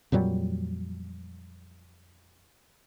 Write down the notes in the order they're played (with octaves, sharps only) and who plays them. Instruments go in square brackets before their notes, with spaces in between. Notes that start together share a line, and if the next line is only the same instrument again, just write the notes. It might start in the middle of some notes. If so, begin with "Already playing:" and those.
[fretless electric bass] F2 A#2 F#3 G3